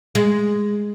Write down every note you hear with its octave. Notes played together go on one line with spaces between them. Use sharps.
G#3